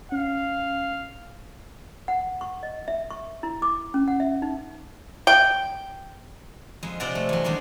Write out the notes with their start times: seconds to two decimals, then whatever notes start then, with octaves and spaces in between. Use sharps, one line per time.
0.12 C#4 F5
2.08 F#5
2.41 C#6
2.63 D#5
2.88 E5
3.11 C#6
3.43 E4
3.62 D6
3.94 C#4
4.08 F#5
4.20 E5
4.42 D#4
5.27 G5
6.83 F2 G#3
7.00 C3 F3 C4 D5 F#5 A#5
7.15 A3
7.29 E2 F#3
7.44 D#3 G3 G#3 D4